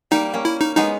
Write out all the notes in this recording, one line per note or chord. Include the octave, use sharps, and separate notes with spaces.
G3 A#3 D#4
A#3 C#4
E4
D#4
G#3 B3 D#4